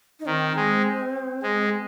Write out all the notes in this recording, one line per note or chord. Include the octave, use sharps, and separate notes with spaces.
D#4
D#3 C4
G#3
G#3